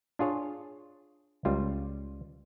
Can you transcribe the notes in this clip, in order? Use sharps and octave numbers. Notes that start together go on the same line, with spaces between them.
D4 F4 G#4 C#5
C#2 G3 F4